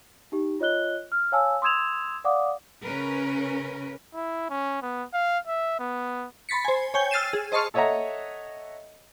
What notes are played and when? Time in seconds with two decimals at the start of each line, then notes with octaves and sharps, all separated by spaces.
0.32 D#4 G4
0.60 F4 C#5 D#5 F#6 G7
1.12 F6
1.32 C#5 F5 G#5 A5 E6
1.62 C6 D#6 E6 G#6 E7 F7
2.24 D5 F5 F#5 D6 D#6
2.82 C#3 C#4 A#4 B4
4.14 E4
4.50 C#4
4.82 B3
5.13 F5
5.47 E5
5.79 B3
6.49 B5 C6 A6 B6 C#7
6.65 C5 G#5
6.94 C#5 G5 G#5 G6
7.11 E6 F6 A6 C7 D#7 E7
7.33 G#4
7.52 C5 D#5 A5 C6 C#6 F6
7.74 A4 C#5 D#5 E5 F#5 A#5